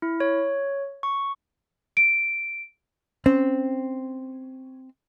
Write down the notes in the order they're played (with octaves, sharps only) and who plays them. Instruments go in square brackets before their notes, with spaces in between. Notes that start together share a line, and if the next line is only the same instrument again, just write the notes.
[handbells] E4
C#5
C#6
[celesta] D7
[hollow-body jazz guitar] C4 [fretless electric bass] C#4